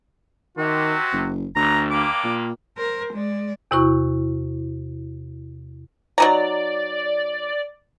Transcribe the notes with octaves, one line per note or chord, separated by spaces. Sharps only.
C3 D#3 F#4
F#1
G#1 D2 A#5
G2 A#3 D6
A#2
A#4 C5
G#3 D5
E2 C3 E4 F#4 C#6
F#3 D#4 D5 A#5